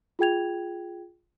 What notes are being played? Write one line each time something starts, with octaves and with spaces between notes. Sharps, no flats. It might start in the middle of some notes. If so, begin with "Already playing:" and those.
F4 G#4 G5 G#6 F7